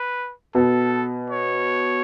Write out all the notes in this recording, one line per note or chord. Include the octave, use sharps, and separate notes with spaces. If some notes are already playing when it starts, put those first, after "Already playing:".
Already playing: B4
B2 A4
C#5